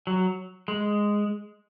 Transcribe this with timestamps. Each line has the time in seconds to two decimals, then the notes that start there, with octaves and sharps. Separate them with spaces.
0.07 F#3
0.68 G#3